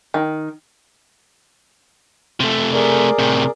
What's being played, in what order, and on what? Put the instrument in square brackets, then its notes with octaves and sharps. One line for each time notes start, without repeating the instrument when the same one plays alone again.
[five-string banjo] D#3
[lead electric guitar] C3 A3
[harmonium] G#4 A#4 D5
[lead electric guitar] A2 C3